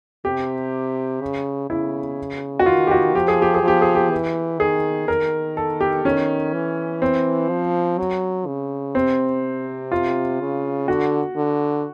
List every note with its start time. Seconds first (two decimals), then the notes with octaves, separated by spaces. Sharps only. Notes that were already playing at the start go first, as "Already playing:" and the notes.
0.25 C3 G4
1.21 C#3
1.70 C#3 E4
2.60 F#4
2.66 D#3 F4
2.87 G4
2.91 F#4
3.15 F3 G4
3.28 G#4
3.42 G4
3.55 G#4
3.63 F3
3.68 G4
3.82 G#4
3.95 G4
4.11 E3
4.60 D#3 G#4
5.08 D#3 A#4
5.57 A4
5.81 G4
6.05 D#3 C#4
6.53 E3
7.02 C4
7.49 F3
7.98 F#3
8.47 C#3
8.95 C3 C4
9.92 F4
10.40 C#3
10.88 D3 F#4
11.36 D3